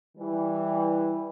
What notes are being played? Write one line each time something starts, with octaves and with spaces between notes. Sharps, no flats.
E3 G3